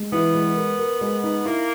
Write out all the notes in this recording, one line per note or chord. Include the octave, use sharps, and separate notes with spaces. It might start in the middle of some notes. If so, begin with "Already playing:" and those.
Already playing: G#3
E3 B3
G#3
A#4
A#4
G#3
D#4
A#3 E4